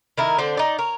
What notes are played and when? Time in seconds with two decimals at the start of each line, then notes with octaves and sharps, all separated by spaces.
0.18 D#3 E4 A#4
0.38 D3 C4 D4 C5
0.57 D#4 D5
0.78 A#4 C#5